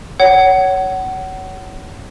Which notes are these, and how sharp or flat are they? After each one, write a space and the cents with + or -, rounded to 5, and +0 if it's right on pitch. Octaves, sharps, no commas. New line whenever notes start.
C#5 +15 F#5 +25